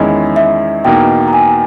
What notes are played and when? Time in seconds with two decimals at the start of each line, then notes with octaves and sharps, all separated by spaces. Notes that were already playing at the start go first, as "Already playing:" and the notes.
Already playing: E2 D#3 G#3 C#4 E4 D#5
0.36 E5
0.85 E2 B2 A#3 D#4 G5
1.28 A#5
1.33 G#5